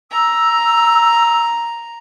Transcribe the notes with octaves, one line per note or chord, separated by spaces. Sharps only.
A#5 E6